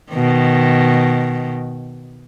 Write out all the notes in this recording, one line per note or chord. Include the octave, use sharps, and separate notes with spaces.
B2 D#3